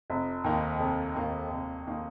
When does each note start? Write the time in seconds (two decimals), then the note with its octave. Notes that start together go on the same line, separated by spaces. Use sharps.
0.10 F1
0.44 D#2 D#3 A#3 D#4
0.80 F1
1.15 D#2 D#3 A#3 D#4
1.51 F1
1.87 D#3 A#3 D#4